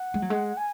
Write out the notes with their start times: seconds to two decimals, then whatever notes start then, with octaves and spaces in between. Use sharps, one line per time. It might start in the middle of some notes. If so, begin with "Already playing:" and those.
Already playing: F#5
0.14 G#3
0.22 F#3
0.30 G#3
0.57 G#5